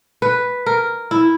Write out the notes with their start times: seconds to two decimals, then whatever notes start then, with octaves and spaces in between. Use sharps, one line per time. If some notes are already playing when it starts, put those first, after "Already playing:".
0.22 B4
0.66 A#4
1.11 E4